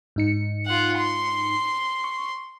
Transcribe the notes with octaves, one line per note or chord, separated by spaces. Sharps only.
G#2 D#4 C#7
F4 F#5
C6
C#6